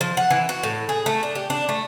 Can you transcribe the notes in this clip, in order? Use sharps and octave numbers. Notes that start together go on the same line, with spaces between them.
F3
F#5
E3
F#4
A2
G#4
A3
D4
G4
D4
A3